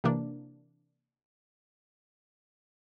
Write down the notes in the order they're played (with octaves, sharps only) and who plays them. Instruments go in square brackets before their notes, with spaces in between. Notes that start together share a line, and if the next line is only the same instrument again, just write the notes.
[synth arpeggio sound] C3 E3 A#3 D4